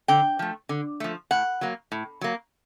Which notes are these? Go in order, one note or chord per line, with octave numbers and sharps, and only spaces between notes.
D3 G5
F3 A3
D3
F3 A3
A2 F#5
F#3 A#3
A2
F#3 A#3